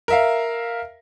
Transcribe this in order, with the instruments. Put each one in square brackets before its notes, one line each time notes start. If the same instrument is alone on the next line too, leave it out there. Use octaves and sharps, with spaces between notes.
[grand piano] A#4 E5 F5